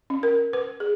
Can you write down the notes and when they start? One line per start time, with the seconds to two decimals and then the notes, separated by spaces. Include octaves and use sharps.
0.10 C#4
0.23 A#4
0.53 B4
0.80 G#4